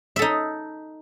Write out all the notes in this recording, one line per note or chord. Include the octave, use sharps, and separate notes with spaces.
D#4 A4 E5